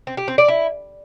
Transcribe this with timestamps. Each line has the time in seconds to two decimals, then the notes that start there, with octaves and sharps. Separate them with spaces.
0.07 C4
0.17 G4
0.28 C4
0.38 D5
0.48 E4